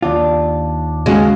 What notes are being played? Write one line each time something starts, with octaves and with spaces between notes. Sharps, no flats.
D#2 D4 F4
C#3 G#3 C#4 F#4 F5